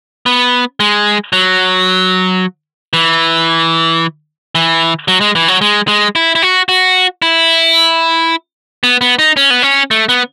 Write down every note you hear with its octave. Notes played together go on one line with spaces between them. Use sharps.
B3
G#3
F#3
E3
E3
F#3
G#3
E3
F#3
G#3
G#3
E4
E4
F#4
F#4
E4
B3
B3
D#4
C#4
B3
C#4
A3
B3